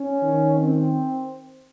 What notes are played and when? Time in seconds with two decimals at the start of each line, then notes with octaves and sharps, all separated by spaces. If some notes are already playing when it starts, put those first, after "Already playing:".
Already playing: C#4
0.23 D#3
0.55 C4